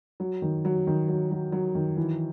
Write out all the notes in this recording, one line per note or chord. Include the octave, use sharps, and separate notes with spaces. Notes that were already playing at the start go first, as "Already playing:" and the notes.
F#3
D#3
F#3
D#3
F#3
F#3
F#3
D#3
E3